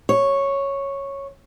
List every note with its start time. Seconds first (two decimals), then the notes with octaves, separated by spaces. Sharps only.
0.09 C#5